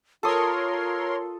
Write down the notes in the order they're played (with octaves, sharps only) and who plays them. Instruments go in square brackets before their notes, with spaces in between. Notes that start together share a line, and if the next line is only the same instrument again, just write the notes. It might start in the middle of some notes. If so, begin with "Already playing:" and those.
[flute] F4 [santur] A4 D#6 [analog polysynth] A#4 C#5 C6